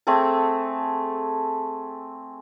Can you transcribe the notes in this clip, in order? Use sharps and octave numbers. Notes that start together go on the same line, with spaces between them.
A3 C4 G#4 A4